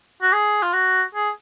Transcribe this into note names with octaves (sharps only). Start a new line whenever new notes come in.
F#4
G#4
F4
F#4
G#4